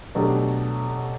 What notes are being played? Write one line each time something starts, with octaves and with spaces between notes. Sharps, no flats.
B2 F#3 A3 D4 G4